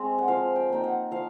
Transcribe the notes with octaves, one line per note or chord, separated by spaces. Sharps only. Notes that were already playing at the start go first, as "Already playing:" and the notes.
Already playing: G#3 C4
F#5
F3 F5
G5
A#3 D#4 G5
F#5
F3 F5